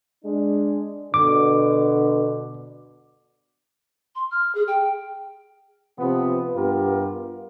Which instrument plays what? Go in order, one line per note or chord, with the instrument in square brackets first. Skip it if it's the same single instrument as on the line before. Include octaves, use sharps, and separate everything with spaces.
[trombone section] G#3 D4
[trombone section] B2 D3 [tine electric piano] D6
[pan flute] C6
F6
G#4
G5
[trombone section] C3 F3 B3
G2 B3 F4 G4 A#4